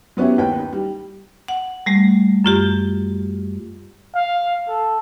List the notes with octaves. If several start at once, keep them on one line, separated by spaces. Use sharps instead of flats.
F#3 B3 C#4 E4 G4
D#2 B4 G5
D#4
G3
F#5
G3 A3
F#2 F4 G4
F5
A4